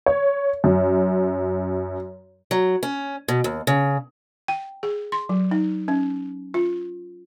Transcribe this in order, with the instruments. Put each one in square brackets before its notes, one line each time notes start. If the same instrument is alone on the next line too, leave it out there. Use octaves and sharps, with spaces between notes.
[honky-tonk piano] C#5
F#2
[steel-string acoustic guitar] F#3
C#4
B2
D#2
C#3
[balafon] G5
G#4
C6
F#3
D#4
C#4
F4